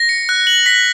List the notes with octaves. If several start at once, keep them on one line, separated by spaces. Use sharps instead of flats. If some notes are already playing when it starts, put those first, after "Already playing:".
Already playing: A#6
C#7
F#6
F#7
B6